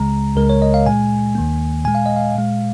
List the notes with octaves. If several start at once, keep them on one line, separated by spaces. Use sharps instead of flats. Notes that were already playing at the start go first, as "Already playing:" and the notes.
Already playing: C#2 C#3 G#3 A#5
C#2 C#3 G#3 A#4
C#5
D#5
F5
A#2 G#3 G#5
D#2 D#3 A#3
A#2 G#3 G#5
F5
D#5
F5
A#2 G#3